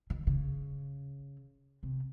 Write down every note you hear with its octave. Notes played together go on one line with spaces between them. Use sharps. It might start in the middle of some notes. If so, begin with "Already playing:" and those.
D#3
C#3
C3